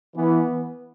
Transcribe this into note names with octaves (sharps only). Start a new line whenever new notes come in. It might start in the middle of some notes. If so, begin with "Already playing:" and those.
E3 B3